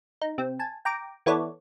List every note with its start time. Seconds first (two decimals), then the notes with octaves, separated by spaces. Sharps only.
0.22 D#4
0.38 C3 C4
0.59 G#5 A5
0.85 G5 A#5 D6
1.26 E3 B3 E4 A4 C#5 D5